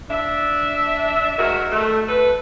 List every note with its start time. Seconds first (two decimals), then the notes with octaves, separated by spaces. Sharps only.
0.10 D4 E5
1.38 G#2 D#3 F#4 A#4 E5
1.71 A3
2.08 A4 B4